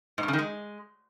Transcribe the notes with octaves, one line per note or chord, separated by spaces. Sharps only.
G#2
G2
C#3
D#3
G#3